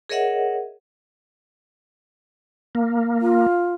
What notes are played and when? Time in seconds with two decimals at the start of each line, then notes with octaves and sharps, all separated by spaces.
0.09 G#4 A#4 C#5 D#5 E5 F#5
2.75 A#3
3.21 F4